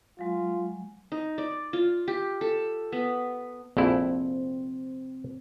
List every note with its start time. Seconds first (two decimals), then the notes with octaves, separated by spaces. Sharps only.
0.19 F#3 G#3 F4
1.12 D#4
1.38 D5
1.73 F4
2.08 G4
2.41 A4
2.92 B3
3.77 A#1 F2 C4 E4